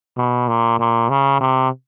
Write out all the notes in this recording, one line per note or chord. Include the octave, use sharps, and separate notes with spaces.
B2
A#2
A#2
C#3
C3